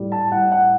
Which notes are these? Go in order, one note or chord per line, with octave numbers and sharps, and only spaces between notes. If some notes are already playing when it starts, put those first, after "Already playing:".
Already playing: A2 G3
A5
A2 G3 F#5
F#5